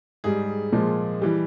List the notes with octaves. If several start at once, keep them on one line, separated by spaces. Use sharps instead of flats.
G#2 G3 G#4
A#2 F3 G#3
E3 G3